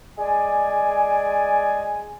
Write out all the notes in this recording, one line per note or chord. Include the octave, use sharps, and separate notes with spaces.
G#3 D5 G#5